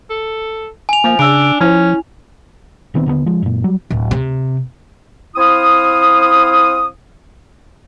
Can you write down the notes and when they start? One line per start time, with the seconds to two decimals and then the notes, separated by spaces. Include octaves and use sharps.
0.10 A4
0.89 G#5 F7
1.04 F3 A#3
1.19 C#3 D4 E6 D7
1.61 F3 C#4 E4
2.94 A#1 D#3 B3 C4
3.06 D#2 D3 F#3 B3
3.26 F3 G#3
3.42 F#2 A#2
3.64 F#3 G3
3.90 D1
4.11 C3
5.37 C4 E4 F5 D#6